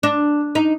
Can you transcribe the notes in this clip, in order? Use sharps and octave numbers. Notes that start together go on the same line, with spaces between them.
D4
D#4